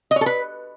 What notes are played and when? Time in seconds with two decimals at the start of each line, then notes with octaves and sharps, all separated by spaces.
0.11 D#5
0.16 C#5
0.21 A4
0.26 B4